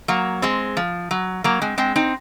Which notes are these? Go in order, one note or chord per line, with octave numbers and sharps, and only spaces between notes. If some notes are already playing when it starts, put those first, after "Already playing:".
F#3 A#3
G#3 C4
F3
F#3
F#3 A#3
G#3 C4
G#3 C4
C4 D#4